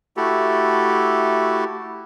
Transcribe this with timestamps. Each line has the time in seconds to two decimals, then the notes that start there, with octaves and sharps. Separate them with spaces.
0.17 A3 E4 F#4 G4 A4